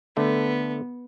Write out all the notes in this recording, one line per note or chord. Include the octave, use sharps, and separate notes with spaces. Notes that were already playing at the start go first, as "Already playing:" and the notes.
D3 A3 B3